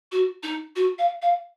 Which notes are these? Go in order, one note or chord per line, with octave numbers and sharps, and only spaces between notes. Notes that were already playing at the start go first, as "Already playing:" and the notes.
F#4
D#4
F#4
F5
F5